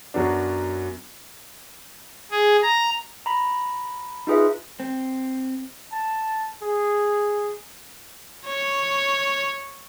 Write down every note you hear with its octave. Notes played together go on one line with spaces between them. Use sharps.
F#2 F#3 B3 D4
G#4
A#5
A#5 B5
D#4 F4 G#4 B4 E5
C4
A5
G#4
C#5